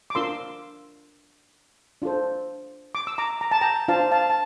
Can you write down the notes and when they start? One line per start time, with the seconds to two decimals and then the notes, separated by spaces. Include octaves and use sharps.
0.10 D6
0.15 D4 F4 A#4 C6 E6
2.02 D4 F4 A4 C5
2.95 D6
3.07 E6
3.18 A#5 D6
3.41 A#5
3.51 A5
3.61 G5 A#5
3.88 D4 F4 C5 F5 A5
4.11 F5 A5
4.30 A5